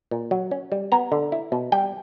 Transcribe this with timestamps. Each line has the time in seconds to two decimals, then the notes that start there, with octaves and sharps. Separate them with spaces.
0.11 A#2
0.31 F#3
0.51 C#4
0.72 G3
0.92 B3 A#5
1.12 D3
1.32 E4
1.52 B2
1.72 G3 G5